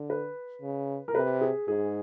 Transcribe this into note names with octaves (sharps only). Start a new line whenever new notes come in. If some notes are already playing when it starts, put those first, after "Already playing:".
Already playing: D3
B4
C#3
A#4
C3 B4
G#4
G#2 G#4